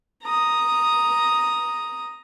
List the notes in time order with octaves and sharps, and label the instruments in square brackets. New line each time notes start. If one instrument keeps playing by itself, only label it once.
[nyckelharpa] A#5 D#6